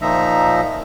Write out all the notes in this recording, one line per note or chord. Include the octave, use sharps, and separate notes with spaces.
A#2 F3 D#4 E5 A#5